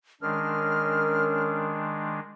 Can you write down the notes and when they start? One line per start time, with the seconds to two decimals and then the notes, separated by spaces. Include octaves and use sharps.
0.22 D#3 G#3 C#4 D4 A#4 F6